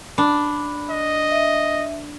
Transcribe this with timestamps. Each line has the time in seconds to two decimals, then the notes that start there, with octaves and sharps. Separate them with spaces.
0.18 D4 B5
0.90 D#5
1.32 E5 D#7